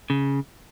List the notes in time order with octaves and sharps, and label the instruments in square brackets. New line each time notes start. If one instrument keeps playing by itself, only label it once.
[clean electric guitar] C#3